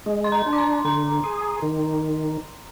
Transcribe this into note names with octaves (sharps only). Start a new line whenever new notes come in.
G#3
C6
A#5
D4
D6
C6
D3 A#5
G#4
D#3